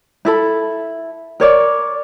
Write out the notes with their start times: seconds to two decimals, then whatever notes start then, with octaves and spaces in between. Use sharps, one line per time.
0.25 E4 A4 B5
1.40 A#4 C#5 D5